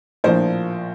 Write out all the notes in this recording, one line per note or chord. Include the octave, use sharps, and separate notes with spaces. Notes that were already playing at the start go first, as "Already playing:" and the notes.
A#1 A2 F3 A#3 D4 C5